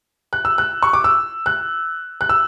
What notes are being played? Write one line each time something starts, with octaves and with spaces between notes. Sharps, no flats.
F#6
E6
F#6
C#6
D6
E6
F#6
F#6
E6